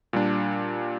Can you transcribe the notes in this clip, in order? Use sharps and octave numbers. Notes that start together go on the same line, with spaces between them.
A#2 G3 D4